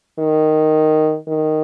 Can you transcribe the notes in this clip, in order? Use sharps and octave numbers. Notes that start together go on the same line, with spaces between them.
D#3
D#3